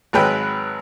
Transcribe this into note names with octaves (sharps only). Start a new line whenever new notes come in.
G#1 F#3 G#3 B4 G5 F#6